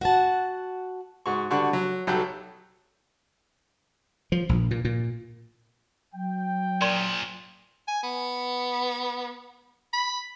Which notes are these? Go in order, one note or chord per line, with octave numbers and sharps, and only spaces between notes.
F#4 F#5 A5
G#2 F#4 C#6
D3 G3 D4 F#4 C#6 F#6
F#3
B1 F#3 G3 A4 G5 F#6
F3
A#1
A#2
A#2
F#3 G5
A#2 F3 A#4 D5 C6
G#5
B3
B5